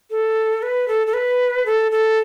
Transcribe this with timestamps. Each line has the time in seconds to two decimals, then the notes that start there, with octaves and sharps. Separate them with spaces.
0.11 A4
0.63 B4
0.88 A4
1.07 A4
1.14 B4
1.66 A4
1.92 A4